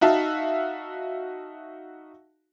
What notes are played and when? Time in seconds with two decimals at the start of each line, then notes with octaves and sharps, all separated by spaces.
0.01 D#4 F#4 E5 F5 A5